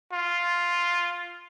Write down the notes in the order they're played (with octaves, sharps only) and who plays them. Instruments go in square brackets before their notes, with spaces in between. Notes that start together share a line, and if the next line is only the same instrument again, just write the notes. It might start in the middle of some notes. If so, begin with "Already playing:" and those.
[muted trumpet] F4